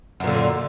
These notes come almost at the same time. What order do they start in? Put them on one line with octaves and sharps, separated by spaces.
F#2 A#2 D3